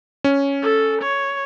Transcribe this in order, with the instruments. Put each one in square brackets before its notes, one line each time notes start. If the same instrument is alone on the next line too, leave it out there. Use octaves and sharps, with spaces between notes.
[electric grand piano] C#4
[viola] A4
C#5